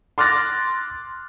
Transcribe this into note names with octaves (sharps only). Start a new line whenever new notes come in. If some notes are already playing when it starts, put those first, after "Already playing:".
C6 D6 F6 F#6 A6 A#6